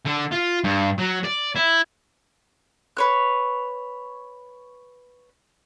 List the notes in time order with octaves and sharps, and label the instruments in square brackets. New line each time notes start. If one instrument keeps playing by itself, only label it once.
[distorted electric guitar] D3
F4
G2
F#3
D5
E4
[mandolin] B4 C#5 F#6